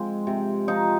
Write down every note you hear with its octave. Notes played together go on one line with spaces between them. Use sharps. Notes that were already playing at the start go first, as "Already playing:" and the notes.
Already playing: F3 G#3 C4
C3
F3 D#4